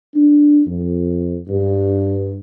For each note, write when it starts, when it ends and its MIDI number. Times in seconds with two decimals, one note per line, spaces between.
0.15 0.62 62
0.67 1.38 41
1.48 2.39 43